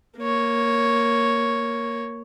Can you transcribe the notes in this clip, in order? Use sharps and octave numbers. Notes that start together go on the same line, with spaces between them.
A#3 C#5